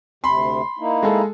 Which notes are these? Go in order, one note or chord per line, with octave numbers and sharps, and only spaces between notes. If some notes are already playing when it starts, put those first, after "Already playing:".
D2 C3 B5 C6
A#3 D#4 E4
G#3 G#4 A4